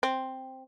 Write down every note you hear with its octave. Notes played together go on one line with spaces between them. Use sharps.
C4